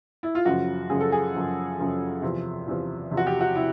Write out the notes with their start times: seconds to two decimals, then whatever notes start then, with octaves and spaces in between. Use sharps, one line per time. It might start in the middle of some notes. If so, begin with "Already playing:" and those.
0.23 E4
0.35 F4
0.45 F#2 C#3 F3 F#4
0.89 F#2 C#3 F3 G#4
1.00 A4
1.12 G#4
1.34 F#2 C#3 F3
1.78 F#2 C#3 F3
2.22 E2 C3 F3
2.67 E2 C3 F3
3.11 E2 C3 F3
3.17 F#4
3.26 G4
3.41 F#4
3.56 C3 E4